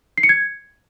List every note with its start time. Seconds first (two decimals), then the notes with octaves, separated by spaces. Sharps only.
0.18 C7
0.23 C#7
0.29 G#6